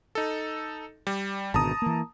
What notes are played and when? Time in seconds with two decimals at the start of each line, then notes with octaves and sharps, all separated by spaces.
0.15 D#4 A4
1.07 G3
1.54 G#1 B2 D3 A5 A#5 D#6
1.82 E3 A#3